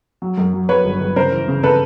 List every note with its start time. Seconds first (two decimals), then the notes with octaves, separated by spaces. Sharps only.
0.22 F#3
0.37 F#2
0.53 F#3
0.69 F#3 B4 C#5
0.85 G1
1.00 G1
1.16 C#3 A#4 C5
1.32 E3
1.48 C#3
1.63 C#3 A4 B4